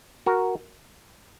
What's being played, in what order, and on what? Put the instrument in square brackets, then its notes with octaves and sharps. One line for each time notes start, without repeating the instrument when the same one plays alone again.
[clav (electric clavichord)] F#4 A#4